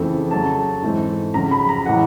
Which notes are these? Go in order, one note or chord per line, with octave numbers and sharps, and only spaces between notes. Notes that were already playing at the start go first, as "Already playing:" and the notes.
Already playing: F2 C#3 E3 A3 C4
C#3 F#3 A3 A5
G#2 E3 A3 C4
F2 C#3 F#3 A#5
B5
A#5
A2 E3 G#3 F#5